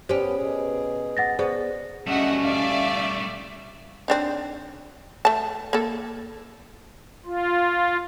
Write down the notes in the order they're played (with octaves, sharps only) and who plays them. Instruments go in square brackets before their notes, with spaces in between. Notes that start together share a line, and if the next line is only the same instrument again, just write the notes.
[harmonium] B3 [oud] C#4 G4 [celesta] C5
[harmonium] B2 G#4
[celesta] F#5 A6 A#6
[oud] B3 [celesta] G#4 C5 D5
[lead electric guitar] G3 A3 [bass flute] C#4 [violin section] F#4 E5 F#5 [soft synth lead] D#5
[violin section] D5 E5 [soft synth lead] F5
[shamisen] C4 D4 D#4
A3 A5
A#3 A4
[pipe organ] F4